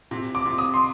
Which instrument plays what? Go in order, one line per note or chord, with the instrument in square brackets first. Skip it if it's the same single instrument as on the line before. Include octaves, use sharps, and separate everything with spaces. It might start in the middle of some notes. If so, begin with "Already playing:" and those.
[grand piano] C3
D6
C3
D#6
C6